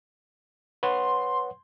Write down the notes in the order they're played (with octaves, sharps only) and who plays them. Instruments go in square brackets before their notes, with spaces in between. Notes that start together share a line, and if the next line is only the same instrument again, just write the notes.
[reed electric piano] B4 C#5 F#5 [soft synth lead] C6